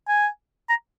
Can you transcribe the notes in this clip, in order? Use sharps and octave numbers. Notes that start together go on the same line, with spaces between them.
G#5
A#5